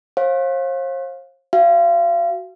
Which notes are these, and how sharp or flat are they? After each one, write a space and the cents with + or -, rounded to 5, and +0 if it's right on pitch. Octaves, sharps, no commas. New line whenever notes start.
C5 +45 F5 +10
F#4 +10 F5 -35